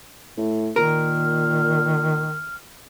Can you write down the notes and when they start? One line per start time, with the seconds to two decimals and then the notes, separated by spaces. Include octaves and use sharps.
0.37 A2
0.76 A#2 D#3 A#4 F6